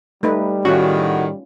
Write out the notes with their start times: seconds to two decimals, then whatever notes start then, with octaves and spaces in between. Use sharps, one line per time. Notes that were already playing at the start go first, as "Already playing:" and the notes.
0.23 G3 A3 D#4 B4
0.65 A2 D#3 C#4 F4 F#4